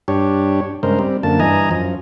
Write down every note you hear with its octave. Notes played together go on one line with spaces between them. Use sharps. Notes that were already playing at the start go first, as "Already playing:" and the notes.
G2 D4 G4 C#5
G2 C#3 G#3 A#4 C5
G3 C4
F#2 D3 A#3 A5
G2 E3 D#5 G#5 A#5
F#2 F3